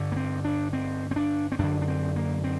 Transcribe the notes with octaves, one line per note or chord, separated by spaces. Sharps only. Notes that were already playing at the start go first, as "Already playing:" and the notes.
Already playing: G2 D3
A#3
C4
D4
C4
C4
D4
C4
F#2 D3 D4
D4
C4
A#3
C4